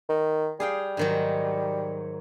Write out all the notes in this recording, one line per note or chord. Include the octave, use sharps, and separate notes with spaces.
D#3
G3 G#4 F5 G5
G#2 D#3 F#3